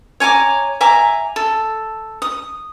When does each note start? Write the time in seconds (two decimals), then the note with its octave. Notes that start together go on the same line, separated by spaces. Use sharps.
0.20 C#5 G#5 A#5 D6
0.81 E5 G#5 A#5 D6
1.36 A4
2.22 D#6